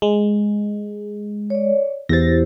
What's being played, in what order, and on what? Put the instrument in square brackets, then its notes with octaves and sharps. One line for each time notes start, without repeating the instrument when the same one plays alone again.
[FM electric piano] G#3
[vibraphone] C#5 D5
[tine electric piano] E2 [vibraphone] E4 G4 C5 [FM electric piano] A6 A#6